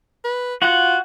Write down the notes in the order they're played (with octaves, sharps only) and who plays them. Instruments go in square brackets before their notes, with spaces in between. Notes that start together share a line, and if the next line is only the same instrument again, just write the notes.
[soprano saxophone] B4
[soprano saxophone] F4 [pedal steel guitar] F#4 F#5